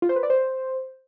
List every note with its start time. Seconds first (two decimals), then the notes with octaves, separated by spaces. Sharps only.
0.02 F4
0.09 C5
0.16 B4
0.23 D5
0.30 C5